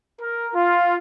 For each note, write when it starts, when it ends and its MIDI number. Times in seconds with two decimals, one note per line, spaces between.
0.20 0.49 70
0.55 0.95 65